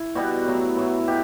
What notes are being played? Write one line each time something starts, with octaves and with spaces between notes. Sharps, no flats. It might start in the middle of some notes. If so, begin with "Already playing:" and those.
Already playing: E4
B2 G3 B3 F#4
A2 F#3 B3
A2 F#3 B3
B2 G4